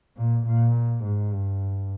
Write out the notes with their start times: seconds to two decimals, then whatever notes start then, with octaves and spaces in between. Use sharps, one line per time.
0.17 A#2
0.47 A#2
1.04 G#2
1.33 G2